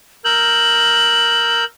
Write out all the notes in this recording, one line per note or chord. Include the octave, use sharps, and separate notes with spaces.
A#4 E6 G6 F#7